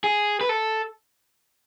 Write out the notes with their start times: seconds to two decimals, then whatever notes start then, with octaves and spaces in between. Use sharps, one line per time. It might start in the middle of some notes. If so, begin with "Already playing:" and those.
0.04 G#4
0.41 B4
0.49 A4